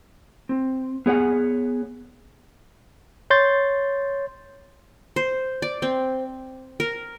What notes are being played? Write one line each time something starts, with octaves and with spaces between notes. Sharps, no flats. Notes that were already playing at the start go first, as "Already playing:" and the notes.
C4
B3 G#4 C#5 F#5
C#5 C6 G6 A6
C5
D5
C4
A#4